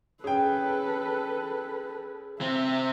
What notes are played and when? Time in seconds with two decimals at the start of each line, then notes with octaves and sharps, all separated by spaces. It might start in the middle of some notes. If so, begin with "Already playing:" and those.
0.24 C#4 G#4 A4 B4 G5
2.41 C3 C4 E5